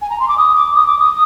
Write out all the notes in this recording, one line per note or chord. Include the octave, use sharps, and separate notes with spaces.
G#5
A#5
C6
D6
D#6
D6
D#6
D6
D#6